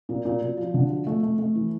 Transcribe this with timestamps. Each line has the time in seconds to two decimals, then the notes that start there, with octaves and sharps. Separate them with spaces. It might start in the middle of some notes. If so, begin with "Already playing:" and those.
0.09 A#2
0.25 A#2
0.42 A#2
0.57 F3
0.74 D3
0.90 F3
1.07 A3
1.23 A3
1.39 A3
1.55 E3